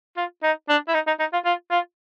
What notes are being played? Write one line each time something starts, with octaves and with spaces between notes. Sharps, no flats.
F4
D#4
D4
E4
D#4
D#4
D#4
F4
F4
F4